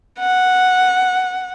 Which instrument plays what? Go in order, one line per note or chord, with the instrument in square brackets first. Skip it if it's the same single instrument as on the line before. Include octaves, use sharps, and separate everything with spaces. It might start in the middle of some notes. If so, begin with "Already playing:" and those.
[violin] F#5